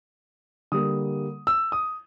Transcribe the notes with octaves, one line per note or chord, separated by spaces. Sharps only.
D3 G3 A#3 D#6
E6
D#6